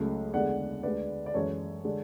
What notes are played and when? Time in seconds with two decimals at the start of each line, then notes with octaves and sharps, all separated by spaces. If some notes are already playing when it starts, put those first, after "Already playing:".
Already playing: C#2 C#3 F#3 A3
0.33 E2 D3 G#3 D5 F#5
0.83 D2 D3 G#3 B4 D5
1.26 D5
1.34 F#2 E3 G#3 A4 C#5
1.84 D3 G#3